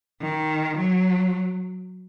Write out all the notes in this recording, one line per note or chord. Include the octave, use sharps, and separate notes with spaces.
D#3
F#3